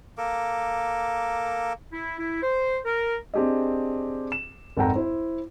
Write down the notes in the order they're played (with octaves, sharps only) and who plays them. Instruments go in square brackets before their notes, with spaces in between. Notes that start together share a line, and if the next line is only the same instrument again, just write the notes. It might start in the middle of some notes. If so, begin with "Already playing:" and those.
[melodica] A#3 A4 A#4 D6
[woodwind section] E4
E4
C5
A#4
[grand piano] C4 D4 G4 G#4 D#5
E7
G#1 F2 A4 F#5 G5 A#5
E4 C5